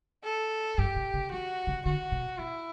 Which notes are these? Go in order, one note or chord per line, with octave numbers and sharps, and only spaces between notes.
A4
G2 G4
B2
C#3
D3 F#4
C#3
D3 F#4
B2
B2 E4